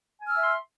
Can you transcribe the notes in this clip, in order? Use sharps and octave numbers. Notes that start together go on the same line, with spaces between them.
E5 G#5 C6 E6 F6